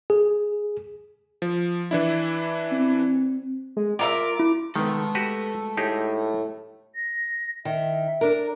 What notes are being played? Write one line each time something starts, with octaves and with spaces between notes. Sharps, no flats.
G#4
F3
E3 D4 E4
C4
G#3
F4 A#4 E5 D6
E4
D#3 G#3 A3 B3 A4
F#4 G4 B4
A2 D#4 G4 G#4
A#6
D#3 E5
D4 A#4